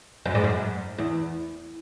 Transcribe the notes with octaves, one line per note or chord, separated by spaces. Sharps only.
F#2
G#2
F#2
E2